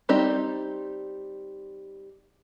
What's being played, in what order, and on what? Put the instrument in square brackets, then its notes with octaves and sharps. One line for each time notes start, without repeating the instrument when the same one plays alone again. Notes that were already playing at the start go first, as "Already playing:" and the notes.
[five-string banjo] G3 C4 D#4 G4 D5